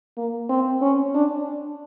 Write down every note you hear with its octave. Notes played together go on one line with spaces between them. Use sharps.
A#3
C4
C#4
D4